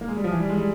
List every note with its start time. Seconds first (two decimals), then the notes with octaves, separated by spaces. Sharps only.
0.01 A#3
0.08 G#3
0.17 G3
0.24 F3
0.31 E3
0.40 G3
0.49 G#3
0.58 G3